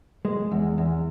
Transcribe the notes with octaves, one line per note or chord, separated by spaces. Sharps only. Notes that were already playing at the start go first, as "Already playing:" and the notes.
G#3
E2
E2